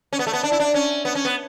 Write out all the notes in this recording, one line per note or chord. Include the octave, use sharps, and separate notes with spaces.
C#4
B3
A3
B3
D4
E4
D4
C#4
B3
C#4
B3